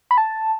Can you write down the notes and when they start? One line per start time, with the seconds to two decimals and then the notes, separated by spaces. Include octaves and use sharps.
0.11 B5
0.18 A5